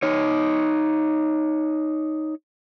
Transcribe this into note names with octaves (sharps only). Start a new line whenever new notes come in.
D#4 C#5